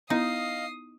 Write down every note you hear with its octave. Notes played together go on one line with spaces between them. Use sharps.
B3 D#4 E4 D#5 F5 D#6 C7